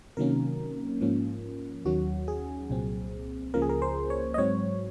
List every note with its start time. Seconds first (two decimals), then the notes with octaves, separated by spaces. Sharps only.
0.17 C3 D#3 F#3 A#3 C#4 A#4
1.01 G#2 F3 A#3 C#4
1.85 D#2 D#3 F#3 C#4 F#4
2.28 G#4
2.70 C2 A#2 F#3 C4
3.54 C#2 C#3 F3 A#3 A#4
3.62 G#4
3.69 A#4
3.82 C5
4.10 C#5
4.34 D#5
4.38 G#2 F#3 C4 C#5